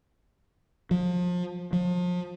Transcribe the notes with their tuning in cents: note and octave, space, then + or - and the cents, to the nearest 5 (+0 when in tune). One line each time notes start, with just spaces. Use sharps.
F3 +30
F3 +35